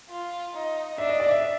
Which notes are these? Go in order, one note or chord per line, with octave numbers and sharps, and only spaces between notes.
F4
D#4
D4 E5
D#5
D5
E5